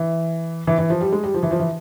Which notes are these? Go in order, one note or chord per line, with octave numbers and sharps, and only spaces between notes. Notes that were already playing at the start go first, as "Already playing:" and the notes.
Already playing: E3
E3
E3
F3
G3
G#3
G3
F3
E3
F3
E3